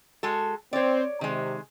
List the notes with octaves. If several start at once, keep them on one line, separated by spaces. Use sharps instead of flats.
G#3 F#4 A4
C4 C#5 D5
C3 D#3 G#3